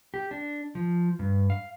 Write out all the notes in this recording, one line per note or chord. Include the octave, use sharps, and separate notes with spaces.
G4
D4
F3
G2
F5